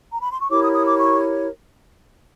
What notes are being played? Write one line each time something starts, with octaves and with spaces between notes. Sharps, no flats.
A#5
B5
C6
C#6
E4 G4 A#4 C#5 D6
D#6
D#6
D6
C#6